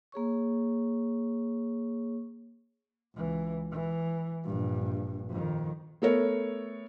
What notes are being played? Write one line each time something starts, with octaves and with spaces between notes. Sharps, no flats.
A#3 G#4 C#5 C#6
C#2 E3
E3
A#1 G2
F2 D#3
A3 B3 A4 A#4 C#5